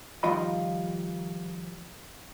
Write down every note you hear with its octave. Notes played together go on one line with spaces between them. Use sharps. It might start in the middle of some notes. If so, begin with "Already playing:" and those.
D#3 F3 G3 F4 D#5 B5